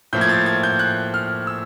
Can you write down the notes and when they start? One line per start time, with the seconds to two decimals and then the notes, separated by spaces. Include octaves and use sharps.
0.13 A2 F3 A#3 G6
0.21 G#6
0.29 A6
0.46 G#6
0.63 G6
0.79 F#6
1.14 F6
1.47 E6